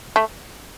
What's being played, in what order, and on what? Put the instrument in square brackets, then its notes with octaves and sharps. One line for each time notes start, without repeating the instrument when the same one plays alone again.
[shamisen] A3